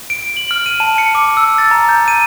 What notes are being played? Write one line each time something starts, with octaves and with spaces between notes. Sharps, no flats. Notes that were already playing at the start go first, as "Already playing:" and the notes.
D7
F#7
F6
D#7
A5
C#7
D6
E6
A6
A#5
G6
D#7